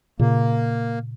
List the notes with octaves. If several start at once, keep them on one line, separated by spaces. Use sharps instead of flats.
A#2 C#3 A#3